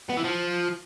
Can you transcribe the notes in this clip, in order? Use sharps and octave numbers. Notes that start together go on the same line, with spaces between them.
B3
E3
F3